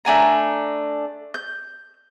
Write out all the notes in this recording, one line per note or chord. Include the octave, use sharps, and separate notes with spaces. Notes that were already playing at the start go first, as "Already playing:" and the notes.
A3 D4 G#5 A#5
G6